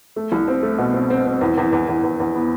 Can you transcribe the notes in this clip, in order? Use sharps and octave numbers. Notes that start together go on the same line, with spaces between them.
A3
C2
C4
A3
B2
C4
C4
C4
E2
E2
E2
E2
E2
E2
B3